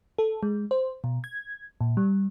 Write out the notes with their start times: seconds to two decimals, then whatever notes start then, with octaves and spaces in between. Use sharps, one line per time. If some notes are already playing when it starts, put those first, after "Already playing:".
0.19 A4
0.43 G#3
0.71 C5
1.04 B2
1.24 G#6
1.81 A#2
1.97 G3